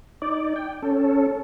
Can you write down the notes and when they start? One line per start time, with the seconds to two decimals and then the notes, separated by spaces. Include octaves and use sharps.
0.22 D#4 D5
0.56 G5
0.82 C#4 A4